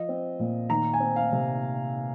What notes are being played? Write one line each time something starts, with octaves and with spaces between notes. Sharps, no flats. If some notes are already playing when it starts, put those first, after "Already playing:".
Already playing: F3 D#5
C4
A#2
D#3 A#5
G#5
C4
F5
C3